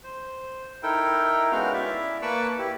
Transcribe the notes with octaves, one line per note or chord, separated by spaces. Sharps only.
C5
D#4 E4 A4 A#4 G5
G#3 B3 C#4 F#4 F5 F6
E4 D5 E5
A#3 B4 A5 B5 C#6 D6
E4 G4